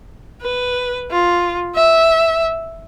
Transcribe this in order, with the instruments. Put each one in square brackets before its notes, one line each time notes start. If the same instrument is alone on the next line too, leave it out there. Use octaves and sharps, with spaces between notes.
[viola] B4
F4
E5